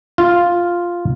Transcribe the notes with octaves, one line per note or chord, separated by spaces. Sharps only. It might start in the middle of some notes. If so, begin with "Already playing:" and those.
F4